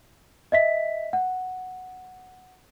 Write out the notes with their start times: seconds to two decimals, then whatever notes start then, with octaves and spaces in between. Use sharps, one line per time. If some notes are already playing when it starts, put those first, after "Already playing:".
0.52 D#5 E5 B6
1.13 F#5